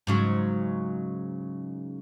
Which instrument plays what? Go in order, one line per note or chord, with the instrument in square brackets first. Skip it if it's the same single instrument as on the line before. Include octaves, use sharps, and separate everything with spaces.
[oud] G#2 C#3 F#3